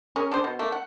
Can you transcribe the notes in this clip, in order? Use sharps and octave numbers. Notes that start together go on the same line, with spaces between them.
C#4 G#4 A#4
D4 G#4 C5
B2
A3 A#3
F#5